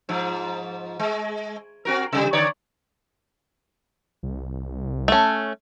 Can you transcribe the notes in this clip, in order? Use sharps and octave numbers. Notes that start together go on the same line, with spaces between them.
G#2 F3
G#3
C4 F#4 A#4
C3 G3
D3 C#5 D5
C2
A3 C#4